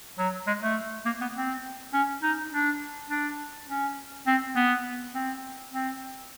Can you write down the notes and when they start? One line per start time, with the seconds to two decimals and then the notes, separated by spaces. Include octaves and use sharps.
0.18 F#3
0.47 G#3
0.62 A3
1.05 A#3
1.21 B3
1.35 C4
1.93 C#4
2.22 D#4
2.52 D4
3.10 D4
3.68 C#4
4.27 C4
4.56 B3
5.14 C4
5.72 C4